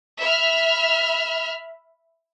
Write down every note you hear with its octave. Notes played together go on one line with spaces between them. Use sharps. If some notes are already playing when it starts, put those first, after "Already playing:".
E5 B5 F6